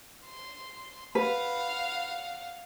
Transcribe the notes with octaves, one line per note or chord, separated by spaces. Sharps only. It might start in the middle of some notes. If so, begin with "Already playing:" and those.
C6
B4 F5 F#5